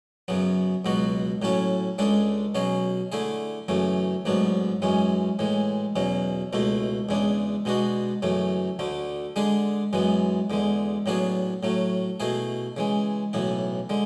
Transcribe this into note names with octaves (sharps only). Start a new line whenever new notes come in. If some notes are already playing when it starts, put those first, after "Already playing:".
F#2 C#3 F#3 B3
C#2 B2 F#3 B3 F#4
A2 F#3 C#4 E4 A4
C#2 C#3 G#3 D4 A4
B2 F#3 C#4 G#4
D3 A3 E4 G#4
F#2 C#3 E3 A3
A1 G#2 F#3 B3 D4
F#2 E3 G#3 C#4
A2 E3 G#3
E2 B2 F#3 C#4
C#2 B2 A3 E4
E2 C#3 G#3 D4
B2 G#3 B3 D4 F#4
F#2 C#3 E3 A3
D2 D3 A3
D3 G#3 D4 G#4
F#2 E3 G#3 B3
E2 D3 G#3
A2 F#3 B3 D4 G#4
A2 F#3 A3
B2 A3 E4 G#4
C#3 E3 G#3
B1 A2 E3 B3 E4
D3 G#3